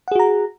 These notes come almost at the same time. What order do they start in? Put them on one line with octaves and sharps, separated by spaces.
F#5 G#4 F#4 A#5